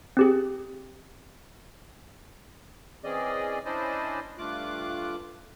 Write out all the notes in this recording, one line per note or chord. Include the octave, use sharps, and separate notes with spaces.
C4 G4 G#4
E3 C4 C#4 G#4 D5 D#5
C#4 D4 E4 C5 D5 D#5
G2 A3 F4 D6 F#6